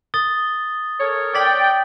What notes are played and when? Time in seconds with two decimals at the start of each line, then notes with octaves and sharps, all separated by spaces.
0.14 D#6 A6 G7
1.00 A4 A#4 C#5
1.35 D5 G5 A6 B6 F#7